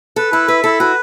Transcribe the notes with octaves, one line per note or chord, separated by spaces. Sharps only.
A4 B4
E4 A4
B4 E5
E4 A4
F#4 B4